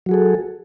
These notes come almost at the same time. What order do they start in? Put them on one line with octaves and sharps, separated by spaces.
F#3 F#4 G#4 A4